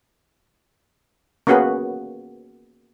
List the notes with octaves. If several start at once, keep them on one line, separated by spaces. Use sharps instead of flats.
A#3 B3 C#4 F#4 G#4 B4